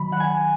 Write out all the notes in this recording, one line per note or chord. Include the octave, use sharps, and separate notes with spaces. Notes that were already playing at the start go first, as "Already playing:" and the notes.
Already playing: D#3 F#3 B5
F#5
G#5